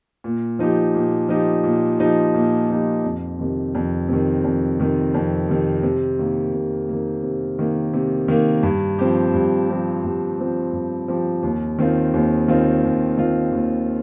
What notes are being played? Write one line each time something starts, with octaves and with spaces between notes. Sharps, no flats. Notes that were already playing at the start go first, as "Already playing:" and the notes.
A#2
F3 D#4 G4
A#2
F3 D#4 G4
A#2
F3 D#4 G4
A#2
F3 D#4 G4
F2
C3 D#3
F2
C3 D#3
F2
C3 D#3
F2
C3 D#3
C3
D#3 A#3
C3
D#3 A#3
C3
D#3 A#3
C3
D#3 A#3
G2
F3 C4 G4
G2
F3 C4 G4
G2
F3 C4 G4
G2
F3 C4 G4
D#2
D#3 C4 F4
D#2
D#3 C4 F4
D#2
D#3 C4 F4
D#2